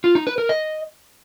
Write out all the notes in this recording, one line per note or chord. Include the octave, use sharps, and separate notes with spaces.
F4
D#4
B4
A#4
D#5